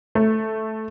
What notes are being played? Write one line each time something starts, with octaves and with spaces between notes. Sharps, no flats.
A3